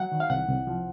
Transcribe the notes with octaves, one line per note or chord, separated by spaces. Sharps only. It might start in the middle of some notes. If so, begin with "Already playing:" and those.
Already playing: F#3 F#5
D#3
F5
C2 F#5
C2
F3